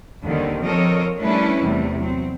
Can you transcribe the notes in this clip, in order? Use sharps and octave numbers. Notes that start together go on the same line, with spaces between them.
D#2 D3 D#3 G3 C4
F3 C4 A4 A#4 C#5 D#5
G3 A3 C#4 D4 E4 B4
E2 C3 G3 A3
F#3 C4